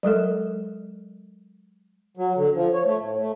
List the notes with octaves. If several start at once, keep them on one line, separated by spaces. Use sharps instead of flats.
F#3 G#3 A4 A#4
F#3
D3
F3
C#5
A3
A2
A3